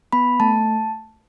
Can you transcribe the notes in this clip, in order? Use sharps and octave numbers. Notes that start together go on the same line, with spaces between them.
B3 B5
A3 A5